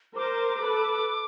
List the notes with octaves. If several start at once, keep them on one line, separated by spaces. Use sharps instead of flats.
A#4 C5 D6
A4 B4